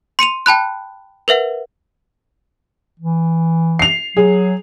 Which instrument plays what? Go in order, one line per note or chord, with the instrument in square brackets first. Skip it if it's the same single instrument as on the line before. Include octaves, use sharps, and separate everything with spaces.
[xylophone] C6 C#7 D#7 F7
G5 A5 B5 F#6
A#4 B4 E5 F#5
[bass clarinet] E3
[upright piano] C7 F7
[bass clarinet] F#3 [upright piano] G#4